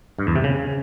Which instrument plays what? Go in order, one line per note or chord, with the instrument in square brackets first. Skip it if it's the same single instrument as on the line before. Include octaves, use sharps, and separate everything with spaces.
[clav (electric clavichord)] G2
E2
C3
C#3